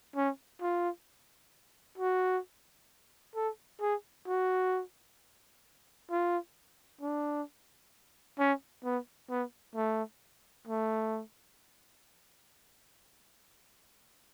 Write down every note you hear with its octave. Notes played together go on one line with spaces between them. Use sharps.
C#4
F4
F#4
A4
G#4
F#4
F4
D4
C#4
B3
B3
A3
A3